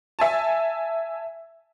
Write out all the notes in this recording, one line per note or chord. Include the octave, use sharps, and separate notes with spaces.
E5 G#5 A5